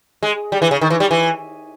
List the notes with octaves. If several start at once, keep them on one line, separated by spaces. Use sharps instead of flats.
G#3
G3
E3
C#3
D#3
E3
G3
E3